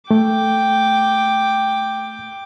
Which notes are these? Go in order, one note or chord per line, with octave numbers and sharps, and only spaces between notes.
A3 G5 D6